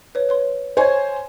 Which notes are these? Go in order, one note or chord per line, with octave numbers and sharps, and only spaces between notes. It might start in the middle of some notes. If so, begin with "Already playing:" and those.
B4 C#5
B4 C#5 C6
C5 C#5 D#5 G#5 G#6